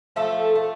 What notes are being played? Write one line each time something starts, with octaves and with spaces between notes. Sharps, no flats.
F3 A3 A4
A3